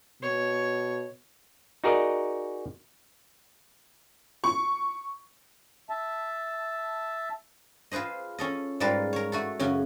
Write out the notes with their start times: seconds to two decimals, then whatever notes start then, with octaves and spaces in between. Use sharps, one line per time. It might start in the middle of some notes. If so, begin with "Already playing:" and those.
0.23 B2 C#5
1.84 D#4 F#4 G#4 A#4 D5 D#5
4.44 C#6
5.90 E5 A5
7.92 F4 G#4 B4 C5 D#5
8.38 C#4 A4 D#5
8.80 G#2 G3 F4 A#4 B4 A5
9.13 A#4 C#5
9.32 A3 F#4 A4
9.59 F#2 C#3 C#4 F#4